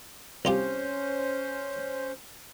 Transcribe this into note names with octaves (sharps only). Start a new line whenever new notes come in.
C2 C#4 F4 G4 C5